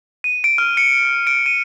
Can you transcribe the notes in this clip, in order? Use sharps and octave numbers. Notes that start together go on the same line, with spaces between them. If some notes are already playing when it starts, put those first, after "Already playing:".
D#7
D7
F6
C#7
D7
D#7